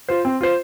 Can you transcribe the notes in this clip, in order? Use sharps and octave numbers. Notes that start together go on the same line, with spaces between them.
F4 C5
C4
F4 C5